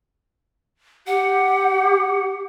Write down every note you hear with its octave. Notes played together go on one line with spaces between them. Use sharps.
G4 F#5